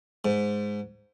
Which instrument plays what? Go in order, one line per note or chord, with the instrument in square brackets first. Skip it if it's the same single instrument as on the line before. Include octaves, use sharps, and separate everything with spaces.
[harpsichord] G#2